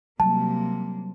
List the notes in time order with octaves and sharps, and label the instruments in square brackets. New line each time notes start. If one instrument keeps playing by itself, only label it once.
[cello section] C3 A#3 [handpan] F#3 G3 [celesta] A5